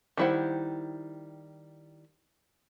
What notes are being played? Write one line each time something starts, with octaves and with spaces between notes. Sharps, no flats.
D#3 G3 E4 C5 F#5